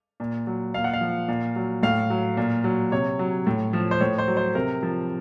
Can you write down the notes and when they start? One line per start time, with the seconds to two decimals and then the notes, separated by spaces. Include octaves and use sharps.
0.20 A#2
0.47 F#3
0.74 A#2 F5
0.84 F#5
0.93 F5
1.01 F3
1.28 A#2
1.56 F#3
1.83 A2 F5
2.10 F#3
2.37 A#2
2.64 F#3
2.91 C3 C#5
3.19 F#3
3.47 A2
3.73 F3
3.91 C5
4.00 A2 C#5
4.18 C5
4.28 F#3
4.37 C5
4.55 C3 A#4
4.83 F3